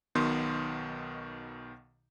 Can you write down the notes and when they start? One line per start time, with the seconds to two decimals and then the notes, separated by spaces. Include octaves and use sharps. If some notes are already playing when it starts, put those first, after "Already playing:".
0.15 B1 B2 D#3 B3 C6 G6